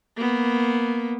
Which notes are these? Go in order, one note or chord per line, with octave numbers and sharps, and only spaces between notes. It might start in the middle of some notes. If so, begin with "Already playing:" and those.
A#3 B3